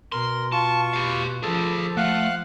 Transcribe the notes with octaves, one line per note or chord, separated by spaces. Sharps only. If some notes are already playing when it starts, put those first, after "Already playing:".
B2 A#4 C6
F4 A5 C#6
G4 F5
F3 F4 G#4 A4 A5
A3 F5 F#5 F#6